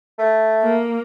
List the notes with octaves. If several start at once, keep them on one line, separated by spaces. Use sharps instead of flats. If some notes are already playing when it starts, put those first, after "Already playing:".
A3
A#3